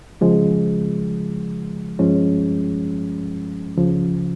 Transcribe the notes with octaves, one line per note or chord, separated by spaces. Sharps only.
C#3 F3 G#3
G2 F3 G#3 C#4
C#2 C#3 F3